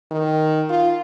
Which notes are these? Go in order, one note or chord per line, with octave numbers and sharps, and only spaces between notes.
D#3
F4